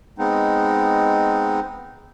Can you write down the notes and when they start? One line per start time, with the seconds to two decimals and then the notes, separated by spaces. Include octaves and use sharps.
0.19 G#3 B3 C4 D#4